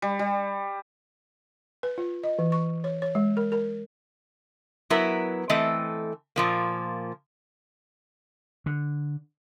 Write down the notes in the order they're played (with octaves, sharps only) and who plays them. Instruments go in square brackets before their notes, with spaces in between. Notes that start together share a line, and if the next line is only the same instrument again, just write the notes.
[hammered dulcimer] G3
G3
[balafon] B4
F4
D#5
E3
C#6
C#5
C#5
G#3
A#4
A#4
[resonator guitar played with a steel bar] F#3 B3 E4 A#4 B4
E3 A3 C4 A4 D#5
A#2 F3 A#3
[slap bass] D3